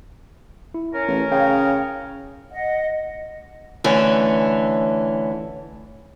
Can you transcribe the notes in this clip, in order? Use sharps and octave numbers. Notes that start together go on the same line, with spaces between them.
E4
C#4 A#4
A1
C#3 C#5 F5 G5
D#5 F#5
D3 E3 A3 C#4